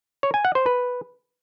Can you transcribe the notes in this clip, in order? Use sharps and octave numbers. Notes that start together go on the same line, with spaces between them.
C#5
G#5
F#5
C5
B4